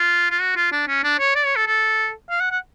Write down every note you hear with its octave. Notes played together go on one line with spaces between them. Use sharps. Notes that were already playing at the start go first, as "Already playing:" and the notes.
Already playing: F4
F4
F#4
F4
D4
C#4
D4
C#5
D5
C#5
A4
A4
F5
F#5
F#5